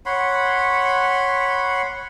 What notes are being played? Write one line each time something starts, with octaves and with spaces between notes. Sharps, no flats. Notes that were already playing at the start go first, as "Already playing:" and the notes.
C#5 F#5 B5 C6